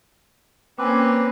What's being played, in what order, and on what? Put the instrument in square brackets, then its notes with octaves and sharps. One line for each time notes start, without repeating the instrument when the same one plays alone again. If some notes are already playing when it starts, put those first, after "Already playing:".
[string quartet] A#3 C#4 [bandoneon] C4 B4 [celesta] G5 G#5 D6